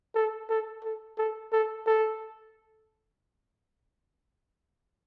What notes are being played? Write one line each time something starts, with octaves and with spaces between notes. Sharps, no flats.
A4
A4
A4
A4
A4
A4